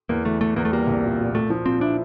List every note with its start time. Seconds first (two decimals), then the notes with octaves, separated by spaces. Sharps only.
0.09 E2 A#3
0.25 E3 A3
0.41 E3 A3
0.56 E2 A#3
0.65 A3
0.72 G3 A#3
0.87 C2
1.04 A#2
1.19 A#2
1.35 A#2 A3
1.50 F3
1.66 A#2 C4
1.81 D4 E4